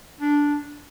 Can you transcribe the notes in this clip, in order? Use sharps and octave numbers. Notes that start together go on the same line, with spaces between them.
D4